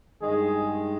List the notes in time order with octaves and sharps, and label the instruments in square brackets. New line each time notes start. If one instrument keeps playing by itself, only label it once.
[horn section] G2 D#3 G#3 G#4